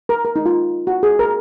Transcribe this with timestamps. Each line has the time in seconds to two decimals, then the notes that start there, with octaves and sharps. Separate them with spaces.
0.09 A#4
0.25 A#4
0.36 D#4
0.46 F4
0.87 F#4
1.03 G#4
1.19 A#4